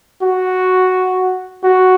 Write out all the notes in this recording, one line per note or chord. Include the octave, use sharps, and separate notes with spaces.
F#4
F#4